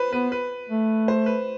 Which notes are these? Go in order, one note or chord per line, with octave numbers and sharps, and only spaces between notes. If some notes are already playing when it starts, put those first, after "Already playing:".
Already playing: B4 C5
B3 B4
B4
A3
C5
B4